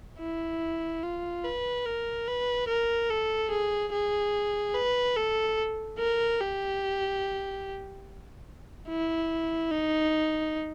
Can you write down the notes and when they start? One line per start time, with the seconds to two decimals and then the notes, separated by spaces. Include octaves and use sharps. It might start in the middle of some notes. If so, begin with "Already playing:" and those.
0.20 E4
1.03 F4
1.45 B4
1.86 A#4
2.28 B4
2.68 A#4
3.10 A4
3.51 G#4
3.93 G#4
4.75 B4
5.17 A4
5.99 A#4
6.41 G4
8.89 E4
9.72 D#4